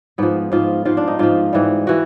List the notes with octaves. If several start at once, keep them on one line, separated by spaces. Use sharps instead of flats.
G#2 F3 B3
G#2 F3 F4
G#2 F3 F4
D4
D#4
G#2 F3 F4
G#2 E3 G3
E3 F#4